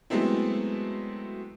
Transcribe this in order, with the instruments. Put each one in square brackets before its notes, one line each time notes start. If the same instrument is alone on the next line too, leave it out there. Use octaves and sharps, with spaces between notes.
[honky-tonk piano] F#3 G#3 A3 B3 C4 E4